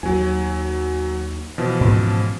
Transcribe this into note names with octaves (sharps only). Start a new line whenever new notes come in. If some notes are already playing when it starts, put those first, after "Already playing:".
D#2 F#3 G#5
B2 E3 F3
G#2 C#4